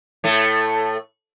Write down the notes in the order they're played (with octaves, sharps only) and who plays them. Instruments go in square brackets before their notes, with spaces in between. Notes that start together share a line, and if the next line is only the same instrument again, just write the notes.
[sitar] A2 A3